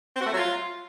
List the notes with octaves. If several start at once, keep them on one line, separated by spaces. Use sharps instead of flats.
C4
F#4
A3
F#3
F4